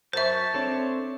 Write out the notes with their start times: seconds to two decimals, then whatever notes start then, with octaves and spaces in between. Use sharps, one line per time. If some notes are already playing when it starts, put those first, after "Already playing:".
0.13 F#2 C5 E5 A5 C#6 G6
0.54 C4 D4 A4 C#5